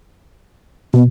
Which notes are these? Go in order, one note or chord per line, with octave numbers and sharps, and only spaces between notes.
B2 B3